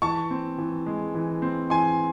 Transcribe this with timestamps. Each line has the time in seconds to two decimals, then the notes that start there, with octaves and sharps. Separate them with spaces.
0.02 E3 A5 C#6
0.31 C4
0.58 E3
0.86 G#3
1.15 E3
1.42 C4
1.70 E3 G#5 C6